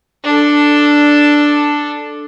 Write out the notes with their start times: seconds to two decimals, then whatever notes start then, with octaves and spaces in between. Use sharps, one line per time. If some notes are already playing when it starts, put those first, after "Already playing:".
0.24 D4 A4